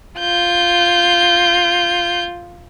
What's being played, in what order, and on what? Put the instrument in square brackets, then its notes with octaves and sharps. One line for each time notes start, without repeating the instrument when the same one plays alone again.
[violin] F4 G6